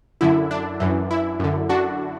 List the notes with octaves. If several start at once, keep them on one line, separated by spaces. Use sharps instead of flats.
F#2 D3 E4
D4
F#2 E3
E4
F#2 D3
D4 F#4